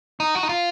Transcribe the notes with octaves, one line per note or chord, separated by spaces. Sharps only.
D#4
F#4
D#4
F4